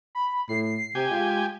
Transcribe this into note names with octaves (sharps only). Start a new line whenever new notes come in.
B5
A2 C7
C3 G4 G#5
G#3 F4